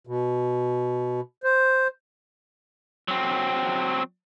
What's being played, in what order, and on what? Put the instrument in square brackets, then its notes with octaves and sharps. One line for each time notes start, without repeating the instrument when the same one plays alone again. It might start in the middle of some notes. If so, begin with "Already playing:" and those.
[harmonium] B2
C5
[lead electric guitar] F#3 C4